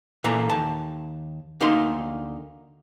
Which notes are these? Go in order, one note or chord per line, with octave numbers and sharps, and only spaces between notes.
A#2 E3 A#3 A4 A#5
D#2 A5
D2 A#3 D#4 A#4 C6